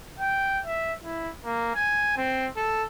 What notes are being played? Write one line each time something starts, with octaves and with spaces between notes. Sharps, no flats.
G5
E5
E4
A#3
G#5
C4
A4